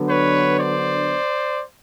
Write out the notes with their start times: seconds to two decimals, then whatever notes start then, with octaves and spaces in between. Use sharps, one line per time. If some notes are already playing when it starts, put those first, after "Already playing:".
Already playing: D3 F#3 B3 D4
0.09 B4 C#5
0.58 C5 D5